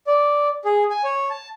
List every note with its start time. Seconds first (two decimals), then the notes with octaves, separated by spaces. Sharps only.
0.07 D5
0.65 G#4
0.90 G#5
1.04 C#5
1.30 A5